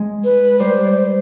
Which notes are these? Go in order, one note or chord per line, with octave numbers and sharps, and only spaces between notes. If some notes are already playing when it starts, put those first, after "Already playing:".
Already playing: G#3
B4
G3 C5
D5
C5